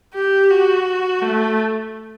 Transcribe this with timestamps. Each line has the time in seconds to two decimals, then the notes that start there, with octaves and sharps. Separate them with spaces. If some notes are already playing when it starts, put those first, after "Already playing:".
0.14 G4
0.50 F#4
1.22 A3